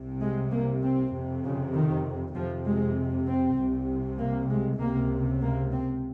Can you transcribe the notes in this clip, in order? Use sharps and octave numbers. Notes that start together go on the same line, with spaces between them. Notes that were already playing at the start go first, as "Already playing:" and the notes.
Already playing: C2 C3
G#3
A#3
C4
F2 C3
C#3
D#3
F2 C3 F3
G#3
C4
C2 C3
A#3
G#3
C#2 C3 A#3
A#3
C4